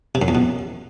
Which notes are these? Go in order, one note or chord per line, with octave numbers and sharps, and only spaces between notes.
C3
F#2
E2
B2